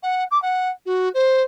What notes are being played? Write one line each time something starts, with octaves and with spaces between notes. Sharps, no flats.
F#5
D6
F#5
F#4
C5